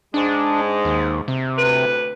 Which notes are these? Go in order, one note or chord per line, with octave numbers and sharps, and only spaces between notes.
G#2 G#3 D4
D#2
C3
D2 B4